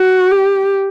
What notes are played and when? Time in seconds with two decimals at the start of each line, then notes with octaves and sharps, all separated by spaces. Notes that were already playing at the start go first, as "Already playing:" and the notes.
Already playing: F#4
0.32 G4